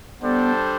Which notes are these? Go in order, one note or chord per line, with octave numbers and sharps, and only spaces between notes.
G3 B3 D4 A4 C5